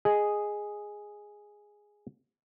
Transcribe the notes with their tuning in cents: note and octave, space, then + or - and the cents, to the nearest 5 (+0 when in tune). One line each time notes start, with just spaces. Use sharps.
G#4 +0 D#5 +0